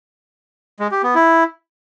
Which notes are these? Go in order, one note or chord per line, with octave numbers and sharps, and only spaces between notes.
G#3
G4
B3
E4